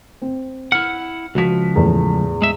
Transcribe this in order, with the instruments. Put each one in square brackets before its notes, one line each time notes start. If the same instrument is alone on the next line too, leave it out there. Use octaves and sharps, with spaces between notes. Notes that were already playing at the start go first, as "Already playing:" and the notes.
[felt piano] C4
[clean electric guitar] E4 F#5 [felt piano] F6
[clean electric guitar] C#2 F3 [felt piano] F#4 B6
[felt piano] E2 A2
[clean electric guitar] G#3 E5